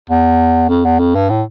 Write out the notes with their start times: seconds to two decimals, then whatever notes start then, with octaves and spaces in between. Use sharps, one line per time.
0.10 E2
0.69 F2
0.85 E2
0.99 F2
1.15 G2
1.30 A2